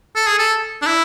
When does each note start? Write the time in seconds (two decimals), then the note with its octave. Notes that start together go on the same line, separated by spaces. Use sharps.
0.16 A4
0.27 G#4
0.38 A4
0.82 D4
0.86 E4